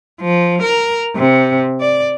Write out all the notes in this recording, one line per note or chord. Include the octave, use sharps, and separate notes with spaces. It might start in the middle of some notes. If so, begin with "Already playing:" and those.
F3
A#4
C3
D5